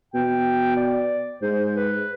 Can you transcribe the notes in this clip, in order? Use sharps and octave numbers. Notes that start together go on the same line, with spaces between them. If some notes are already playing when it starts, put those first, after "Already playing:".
B2 G5
D5
G#2 C5
B4